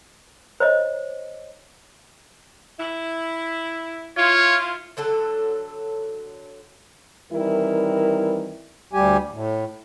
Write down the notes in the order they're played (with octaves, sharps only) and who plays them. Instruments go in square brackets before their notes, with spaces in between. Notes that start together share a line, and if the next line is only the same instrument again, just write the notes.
[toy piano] C5 C#5 D#5
[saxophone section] E4
[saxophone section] E4 F4 [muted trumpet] C#5
[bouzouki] D3 F#3 A4
[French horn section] D#3 E3 G3 C4 E4 A#4
[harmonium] D2 G3 G4 G#5
A2